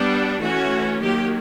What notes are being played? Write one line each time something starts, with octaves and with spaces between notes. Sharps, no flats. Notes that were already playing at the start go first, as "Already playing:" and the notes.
Already playing: G3 B3 D4
E3 A3 C#4 F#4
D#3 F#3 A#3 G4